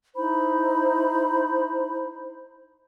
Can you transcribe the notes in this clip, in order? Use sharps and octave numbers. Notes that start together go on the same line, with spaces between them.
D#4 E4 C5 B5